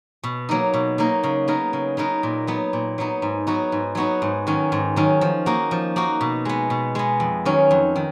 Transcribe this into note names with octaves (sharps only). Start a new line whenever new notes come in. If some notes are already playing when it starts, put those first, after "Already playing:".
B2
F#3 A#3 D#4
B2
F#3 A#3 D#4
C#3
F#3 B3 D#4 A#4
C#3
F#3 B3 D#4 A#4
A#2
F#3 B3 D#4
A#2
F#3 B3 D#4
G#2
F#3 B3 D#4 F#4
G#2
F#3 B3 D#4 F#4
G#2
D#3 F#3 C#4
G#2
D#3 F#3 C#4
F3
A#3 D#4 F#4
F3
A#3 D#4 F#4
B2
G#3 B3
B2
G#3 B3
F2
D#3 F#3 C#4
F2
D#3